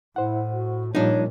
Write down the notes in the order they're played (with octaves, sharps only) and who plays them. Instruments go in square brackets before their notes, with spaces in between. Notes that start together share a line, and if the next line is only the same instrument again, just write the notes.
[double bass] A2 [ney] E4 [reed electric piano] C5 F#5
[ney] F#4
[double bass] A#2 [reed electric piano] F3 G3 F4 [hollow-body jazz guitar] D4 D#4 [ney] C#5